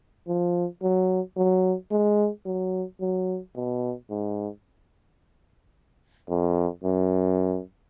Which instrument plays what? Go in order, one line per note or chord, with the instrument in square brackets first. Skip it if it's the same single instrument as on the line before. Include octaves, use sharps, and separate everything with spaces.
[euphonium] F3
F#3
F#3
G#3
F#3
F#3
B2
G#2
F2
F#2